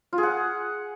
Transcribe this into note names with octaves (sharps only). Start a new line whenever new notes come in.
F4
G#4
F#5